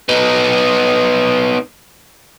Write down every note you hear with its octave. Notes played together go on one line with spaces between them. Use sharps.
B3 D#4